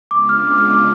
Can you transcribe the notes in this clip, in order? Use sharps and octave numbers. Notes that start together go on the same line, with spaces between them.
C#3 G#3 B3 D4 F4 D6
F6
D6
F6
D6